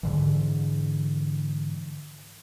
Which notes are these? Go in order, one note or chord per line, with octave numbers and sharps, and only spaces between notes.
G#2 D3 E3